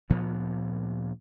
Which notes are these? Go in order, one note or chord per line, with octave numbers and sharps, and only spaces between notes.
D2 A#2 F3 B3